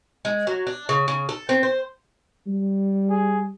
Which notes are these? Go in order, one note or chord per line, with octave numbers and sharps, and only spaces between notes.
G#3
F#3
D4
C#3
C#3
A4
C4
C5
G3
G#4